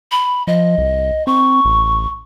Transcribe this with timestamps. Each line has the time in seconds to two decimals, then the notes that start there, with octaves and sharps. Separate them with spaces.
0.12 B5
0.47 F3 D#5
0.78 C2
1.27 C4 C#6
1.65 A1